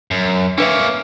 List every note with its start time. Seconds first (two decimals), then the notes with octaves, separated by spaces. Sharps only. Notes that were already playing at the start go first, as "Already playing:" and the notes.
0.11 F#2
0.58 A#3 C#4 D4 B4 E5